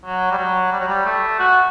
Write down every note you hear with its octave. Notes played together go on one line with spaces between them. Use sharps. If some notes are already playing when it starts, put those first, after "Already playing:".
F#3
G3
F#3
G3
F#3
G3
A3
F#4